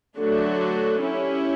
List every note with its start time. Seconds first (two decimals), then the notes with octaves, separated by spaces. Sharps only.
0.16 D3 F#3 A3 D4 F#4
1.00 C#4 E4 G4